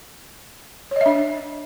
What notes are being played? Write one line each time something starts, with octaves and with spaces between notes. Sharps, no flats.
D4 C#5 D#5 E5